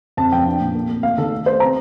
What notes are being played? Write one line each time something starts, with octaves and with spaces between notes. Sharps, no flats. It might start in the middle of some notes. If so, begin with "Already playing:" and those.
F2 A5
F3 G5
D4
A#2
A#3
A#3
A#3 F5
D#3 A4
A3
A3 C5
C3 A#5